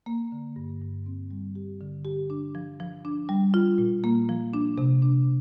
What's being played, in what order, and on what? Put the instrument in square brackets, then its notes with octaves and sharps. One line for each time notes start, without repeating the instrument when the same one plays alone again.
[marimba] A#3
D3
G2
G2
C4
G3
G4
D3
G4
D4
F3
F3
D4
G3
F4
A#2
A#3
F3
D4
C3
D4